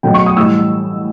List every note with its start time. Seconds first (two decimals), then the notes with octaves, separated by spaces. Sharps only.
0.03 B2 F#3 A3 G5
0.14 C#6
0.26 D#6
0.36 A2 E3 G3 E6